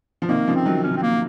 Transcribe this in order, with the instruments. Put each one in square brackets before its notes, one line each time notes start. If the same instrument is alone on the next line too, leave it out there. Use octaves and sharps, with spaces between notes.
[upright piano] F3
[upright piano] C3 D#3 [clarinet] A#3
[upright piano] C#3 F3
[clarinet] C4
[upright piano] D#3 F#3
[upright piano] C3 D#3 [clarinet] C#4
[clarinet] C4
A#3